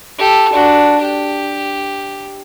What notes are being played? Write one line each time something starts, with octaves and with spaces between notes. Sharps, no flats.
G4 A4
D4 F#4
G4